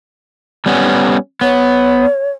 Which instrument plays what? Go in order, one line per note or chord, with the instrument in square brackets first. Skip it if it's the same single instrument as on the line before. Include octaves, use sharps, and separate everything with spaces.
[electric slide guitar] G3 B3 C#4
[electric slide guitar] B3 [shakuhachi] C#5